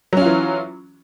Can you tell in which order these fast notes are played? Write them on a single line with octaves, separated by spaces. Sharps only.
F#3 C#4 F4 E3